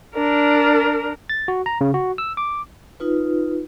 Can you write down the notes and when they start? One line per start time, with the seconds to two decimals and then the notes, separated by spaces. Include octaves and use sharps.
0.15 D4 A#4
1.29 A6
1.48 F#4
1.66 A#5
1.81 C#3
1.94 F#4
2.18 E6
2.37 D6
3.00 D#4 F4 B4